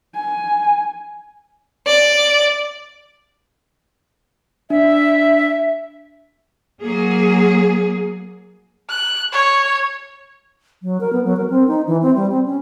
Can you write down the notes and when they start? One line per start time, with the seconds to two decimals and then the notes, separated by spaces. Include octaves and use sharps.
0.15 G#5
1.87 D5
4.70 D4 E5
6.83 F#3 A#3 G#4
8.90 F#6
9.32 C#5
10.83 F#3
11.01 A#4
11.13 B3
11.25 F#3
11.37 A#4
11.50 C4
11.68 D#4
11.87 E3
12.02 C4
12.15 G3
12.31 C4
12.46 C#4